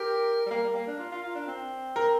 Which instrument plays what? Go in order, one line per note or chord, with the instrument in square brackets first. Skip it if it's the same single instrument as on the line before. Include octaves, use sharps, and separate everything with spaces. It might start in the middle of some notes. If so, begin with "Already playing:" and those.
Already playing: [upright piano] G4 [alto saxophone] A#4
[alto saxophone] G3
[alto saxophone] A#3 [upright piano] A#4
[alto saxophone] G3
A#3
D4
F4
F4
F4
D4
C4
[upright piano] A#4